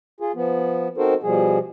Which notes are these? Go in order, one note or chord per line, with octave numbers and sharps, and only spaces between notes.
F4 G#4
F3 B3
C4 D#4 F#4 A4 A#4 C5
B2 F3 G3 G#4